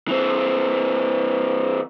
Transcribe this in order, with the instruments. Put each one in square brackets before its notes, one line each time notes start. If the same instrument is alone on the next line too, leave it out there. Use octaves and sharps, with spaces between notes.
[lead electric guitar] E3 C4